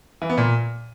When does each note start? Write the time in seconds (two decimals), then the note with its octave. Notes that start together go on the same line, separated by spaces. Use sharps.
0.22 E3
0.30 B3
0.38 A#2